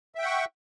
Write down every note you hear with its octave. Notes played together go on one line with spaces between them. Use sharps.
E5 F#5 G5 C#6